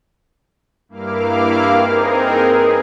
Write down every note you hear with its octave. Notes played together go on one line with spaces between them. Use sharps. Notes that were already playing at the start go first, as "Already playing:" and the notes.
G2 A#3 E4 F5 D6 F6
C4 D#4 G#4 A#4
G#4 B4